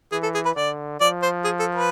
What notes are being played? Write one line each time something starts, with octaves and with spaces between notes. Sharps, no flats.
E3 G#4
A4
G#4
B4
D3 D5
F3 D5
C5
G#4
A4
B4